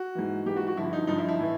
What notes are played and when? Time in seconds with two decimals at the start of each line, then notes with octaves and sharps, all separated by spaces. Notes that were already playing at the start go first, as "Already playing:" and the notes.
Already playing: F#4
0.15 G#2 E3
0.46 G#2 E3 G4
0.56 F#4
0.67 F#4
0.76 G2 D3 F3 E4
0.93 D#4
1.07 G2 D3 F3 D#4
1.18 E4
1.28 E4
1.39 A2 E3